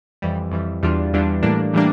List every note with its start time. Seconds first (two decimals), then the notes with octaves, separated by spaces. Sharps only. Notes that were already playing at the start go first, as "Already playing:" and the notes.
0.22 F2 E3 G3
0.51 F2 E3 G3
0.83 E2 E3 G3 D4 F4
1.13 E2 E3 G3 D4 F4
1.43 A2 E3 G3 A#3 D4
1.73 A2 E3 G3 A#3 D4